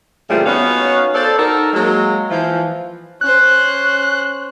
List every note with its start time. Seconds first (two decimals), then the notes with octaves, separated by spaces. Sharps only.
0.30 A#2 C#3 E3 F3 G3 A3
0.46 B3 C#4 D#4 F#4 C#5 F5
1.14 A4 C5 D5
1.38 D#4 F#4 A4 A#4
1.73 F#3 G#3 A#3
2.30 E3 F3
3.21 C#4 C5 F#6